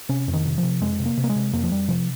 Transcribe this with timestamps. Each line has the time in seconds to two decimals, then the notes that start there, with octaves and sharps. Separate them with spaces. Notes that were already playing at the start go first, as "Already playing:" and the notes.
0.09 C3 C#4
0.28 F2
0.33 D#3
0.45 C3
0.58 F3
0.63 C3
0.81 F2 G#3
0.99 C3
1.06 A#3
1.17 C3
1.24 A#3
1.29 G#3
1.36 C3
1.53 F2 A#3
1.63 F3
1.71 F2 G3
1.88 C3 F3